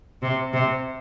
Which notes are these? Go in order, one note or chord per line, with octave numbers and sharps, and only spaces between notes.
C3
C3